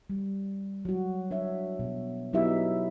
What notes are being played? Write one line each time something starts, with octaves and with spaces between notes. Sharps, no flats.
G3
F#3 F#4
D4 C#5 E5
B2
F#3 B3 D#4 E4 G4 E5